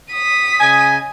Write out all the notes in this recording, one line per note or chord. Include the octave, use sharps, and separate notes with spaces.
D#6 B6
C#3 D#5 G#5